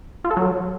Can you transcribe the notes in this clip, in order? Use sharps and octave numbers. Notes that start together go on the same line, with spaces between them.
F4
A4
F#3